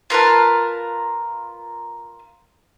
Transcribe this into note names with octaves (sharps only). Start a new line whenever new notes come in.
F4 A#4 B4 A5